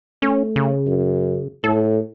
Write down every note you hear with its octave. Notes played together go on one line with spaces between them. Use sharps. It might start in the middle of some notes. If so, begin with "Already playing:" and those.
A3 C#4
C#3
F#2
A2 A4